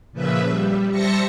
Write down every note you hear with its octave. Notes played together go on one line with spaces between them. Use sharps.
A#2 C#3 F3 B4 E5
G3
G3 C5 E5 A5 A#6 C#7